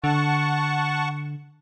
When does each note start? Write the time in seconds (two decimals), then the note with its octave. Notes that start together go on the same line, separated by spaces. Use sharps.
0.04 D3 F#5 A5 C#6